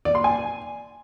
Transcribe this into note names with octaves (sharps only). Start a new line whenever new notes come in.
D5
C6
G#5